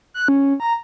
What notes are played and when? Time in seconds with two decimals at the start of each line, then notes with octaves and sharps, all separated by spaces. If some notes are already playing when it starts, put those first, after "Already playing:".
0.14 F#6
0.28 C#4
0.60 A#5